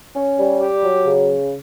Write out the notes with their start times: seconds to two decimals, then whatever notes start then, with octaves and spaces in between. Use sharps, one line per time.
0.15 C#4
0.38 G3
0.61 G4
0.83 F#3
1.06 C#3